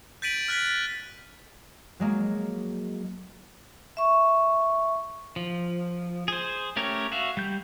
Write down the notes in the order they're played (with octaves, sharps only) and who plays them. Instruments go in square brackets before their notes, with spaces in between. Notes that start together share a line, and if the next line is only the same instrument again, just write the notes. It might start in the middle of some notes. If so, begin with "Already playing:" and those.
[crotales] G6 A6 B6 D7 D#7 F#7
F6 F#6 A6 B6
B6
[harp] F#3 G#3 A#3
[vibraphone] E5 C#6
[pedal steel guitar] F3
G#4 C5
A3 C#4 G4 A#4 C#5
F#4 E5 F5
G3 G6